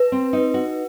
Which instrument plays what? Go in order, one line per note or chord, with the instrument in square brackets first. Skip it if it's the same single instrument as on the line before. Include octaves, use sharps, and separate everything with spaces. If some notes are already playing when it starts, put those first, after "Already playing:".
Already playing: [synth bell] B4
[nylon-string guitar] C4
D#4
F#4